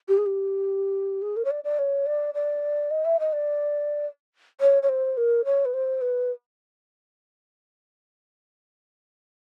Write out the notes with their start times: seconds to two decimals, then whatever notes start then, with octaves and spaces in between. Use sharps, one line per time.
0.08 G4
0.18 G#4
0.26 G4
1.22 G#4
1.36 A#4
1.45 C#5
1.51 D5
1.64 D5
1.79 C#5
2.06 D5
2.34 D5
2.91 D#5
3.05 E5
3.20 D#5
3.33 D5
4.61 C#5
4.83 C#5
4.89 C5
5.17 A#4
5.45 C#5
5.65 B4
5.74 C5
6.01 B4